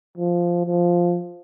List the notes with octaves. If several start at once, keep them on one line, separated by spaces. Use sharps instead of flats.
F3
F3